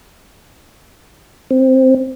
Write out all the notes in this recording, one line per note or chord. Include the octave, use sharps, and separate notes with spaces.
C4